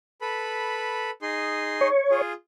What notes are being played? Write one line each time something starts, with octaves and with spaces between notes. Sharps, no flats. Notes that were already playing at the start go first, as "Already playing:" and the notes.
A4 B4 B5
D#4 G#4 C6
C#5
F4 G#4